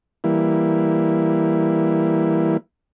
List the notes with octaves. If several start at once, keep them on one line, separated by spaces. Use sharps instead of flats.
E3 G3 A#3 E4